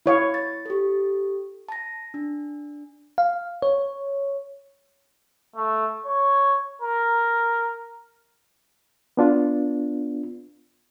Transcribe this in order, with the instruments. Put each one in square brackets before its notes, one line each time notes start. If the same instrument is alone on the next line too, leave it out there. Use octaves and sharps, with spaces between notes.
[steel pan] E4 C#5 F5
[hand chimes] A6
G4 A4
A5 A#6
D4
[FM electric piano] F5
C#5
[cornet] A3
C#5
A#4
[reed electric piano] B3 D4 F4